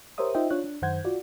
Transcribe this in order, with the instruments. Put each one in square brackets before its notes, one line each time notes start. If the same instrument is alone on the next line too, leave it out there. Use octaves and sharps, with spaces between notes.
[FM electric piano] G4 A#4 C5 C#5 E5 D#6
D#4 F4 C5 D#5 E5 G5
D4 F4 C#5 F#6
D4
F#2 D#3 C5 F#5 G6 G#6
F4 F#4 D5